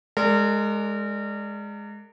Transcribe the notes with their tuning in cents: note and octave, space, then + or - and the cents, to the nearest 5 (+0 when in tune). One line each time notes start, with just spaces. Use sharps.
G#3 +0 A#4 -35 D5 +0